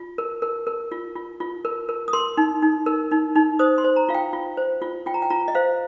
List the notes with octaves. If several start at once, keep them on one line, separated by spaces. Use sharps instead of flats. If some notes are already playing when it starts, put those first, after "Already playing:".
Already playing: F4
A#4
A#4
A#4
F4
F4
F4
A#4
A#4
D#6
A#4 C6
D#4
D#4
A#4
D#4
D#4
C5 D#6
C6
C5
A#5
F4 F5
G5
F4
C5
F4
F4 G5
A#5
G5
F4 A#5
D#5
C5 F5